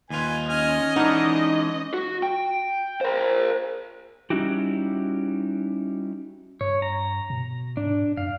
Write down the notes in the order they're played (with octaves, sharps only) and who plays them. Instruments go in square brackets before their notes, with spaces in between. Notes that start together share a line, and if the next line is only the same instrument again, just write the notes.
[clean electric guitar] D#2 F4 [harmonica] B4 G#5
[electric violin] C#4 D#5 [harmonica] G#5 F6
[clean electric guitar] E3 G#3 [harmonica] D4 [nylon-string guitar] D#4 F#5
[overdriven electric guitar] F#4
G5
A#4 C5
[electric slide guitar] G3 C#4 D#4 E4 F#4 G4
[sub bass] G2 [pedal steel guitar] C#5
[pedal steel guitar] A#5
[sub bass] B2
[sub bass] G#2 [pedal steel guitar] D4
[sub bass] F#2 [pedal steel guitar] F5